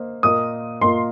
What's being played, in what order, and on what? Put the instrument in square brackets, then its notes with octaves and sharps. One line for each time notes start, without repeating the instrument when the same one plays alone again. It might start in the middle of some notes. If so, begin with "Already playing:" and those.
Already playing: [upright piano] A#3 C5 D#5
[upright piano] A#2 A#3 F4 A#4 D#5 [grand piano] D#6
[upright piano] A#2 A#3 F4 A#4 D#5 [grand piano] C6